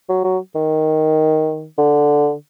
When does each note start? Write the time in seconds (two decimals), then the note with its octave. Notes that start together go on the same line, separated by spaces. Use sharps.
0.09 F#3
0.24 F#3
0.55 D#3
1.78 D3